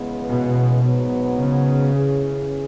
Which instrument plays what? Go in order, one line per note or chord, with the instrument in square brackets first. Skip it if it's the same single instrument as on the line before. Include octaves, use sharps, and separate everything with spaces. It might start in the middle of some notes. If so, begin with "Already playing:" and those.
Already playing: [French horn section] C#3 E3 G#3 B3
[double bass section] B2
[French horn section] G#2 F#3 B3
[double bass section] C#3
[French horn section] E2 E3 C#4 G#4